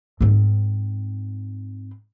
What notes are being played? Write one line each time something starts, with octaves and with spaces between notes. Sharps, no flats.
G#2 C4